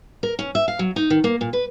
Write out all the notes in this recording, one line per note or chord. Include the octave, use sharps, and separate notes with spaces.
A#4
C#4
E5
F5
F#3
D#4
D#3
A#3
A#2
B4